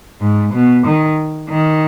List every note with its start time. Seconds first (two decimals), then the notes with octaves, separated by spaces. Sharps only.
0.21 G#2
0.53 B2
0.86 D#3
1.50 D#3